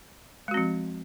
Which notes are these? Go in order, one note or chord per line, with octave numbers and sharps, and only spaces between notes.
F3 G#3 C4 F#4